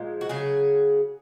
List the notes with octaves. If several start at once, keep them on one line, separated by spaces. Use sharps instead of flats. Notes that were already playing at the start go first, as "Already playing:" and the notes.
Already playing: A#2 F3 G#3
F#4
C#3 F#3 G#4